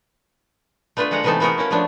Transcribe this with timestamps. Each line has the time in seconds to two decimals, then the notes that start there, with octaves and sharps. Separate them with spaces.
0.97 A3 B3 D4 F4 B4
1.11 D3 G#3 A#3 F#5 A#5
1.24 C3 E3 A3 B3 D#4 A4
1.40 A3 B3 F#4 G#4 A#4 D#5
1.58 A#3 C#4 E4
1.71 F3 F#3 A3 B3 D4